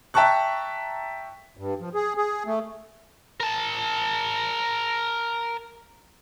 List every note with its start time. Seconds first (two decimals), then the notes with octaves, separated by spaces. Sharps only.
0.14 E5 G5 A5 A#5 C#6 F#6
1.57 G2
1.80 F3
1.95 G#4
2.17 G#4
2.46 A3
3.40 A#4 A5